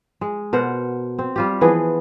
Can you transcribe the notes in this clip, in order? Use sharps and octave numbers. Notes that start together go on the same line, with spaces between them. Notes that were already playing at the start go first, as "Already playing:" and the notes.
G#3
B2 A#4 C5 F#5
C4
G3 F4 G4
E3 F3 B3 G#4